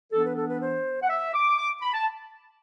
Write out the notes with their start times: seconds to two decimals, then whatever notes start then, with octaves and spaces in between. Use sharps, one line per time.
0.12 E3 B3 D4 A4
0.24 B4
0.37 A4
0.49 B4
0.61 C5
1.03 F#5
1.09 E5
1.34 D6
1.58 D6
1.82 B5
1.94 A5